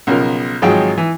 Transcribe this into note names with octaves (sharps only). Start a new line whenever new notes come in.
B1 C#3 F3 A#4
G#1 F3 F#3 G#3 G5
E3